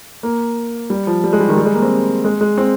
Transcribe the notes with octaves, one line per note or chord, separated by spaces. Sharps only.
A#3
G3
F3
G3
G#3
G3
D#3
G3
G#3
A#3
C4
G#3
G#3
C4